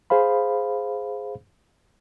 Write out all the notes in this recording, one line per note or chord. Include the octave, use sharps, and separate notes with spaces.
G#4 C5 F5 B5